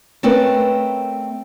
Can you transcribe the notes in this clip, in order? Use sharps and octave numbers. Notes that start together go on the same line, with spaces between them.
A3 C4 C#4 A#4 B4